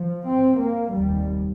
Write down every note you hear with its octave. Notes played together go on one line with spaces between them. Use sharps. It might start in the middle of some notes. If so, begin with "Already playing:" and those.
Already playing: F3
C4
A#3
F1 D#2 G3